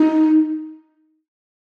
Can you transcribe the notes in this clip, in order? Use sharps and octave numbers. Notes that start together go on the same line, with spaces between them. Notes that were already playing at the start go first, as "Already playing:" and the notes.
Already playing: D#4